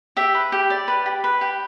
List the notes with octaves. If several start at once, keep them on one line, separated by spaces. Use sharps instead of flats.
G4 E5
B4
G4
D5
B4
G4
B4
G4